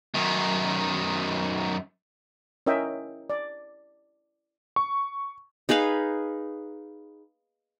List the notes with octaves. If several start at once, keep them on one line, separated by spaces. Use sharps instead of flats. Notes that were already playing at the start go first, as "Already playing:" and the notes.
F#2 D#3
C#4 E4 A#4 D#5 E5 G5
D5
C#6
D#4 G#4 B4 F5